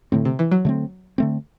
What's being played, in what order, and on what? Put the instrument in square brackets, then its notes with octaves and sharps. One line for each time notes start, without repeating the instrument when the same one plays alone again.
[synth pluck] A2 [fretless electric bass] D3 A3 C4
[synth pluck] C3
E3
F#3
[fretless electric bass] D3 A3 C4
D3 A3 C4